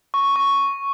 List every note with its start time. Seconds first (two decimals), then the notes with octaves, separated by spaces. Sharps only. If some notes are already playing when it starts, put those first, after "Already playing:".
0.14 C#6
0.36 C#6